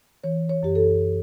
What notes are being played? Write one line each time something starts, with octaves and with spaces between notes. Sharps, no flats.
E3 C#5
C#5
F#2 G4
A4